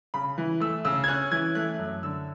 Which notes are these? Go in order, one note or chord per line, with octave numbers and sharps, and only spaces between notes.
C#3 B5
E3
A3 E6
C#3 E6
G#6
C#4 F#6
E3 G#6
A3 F#6
F#2
D3 E6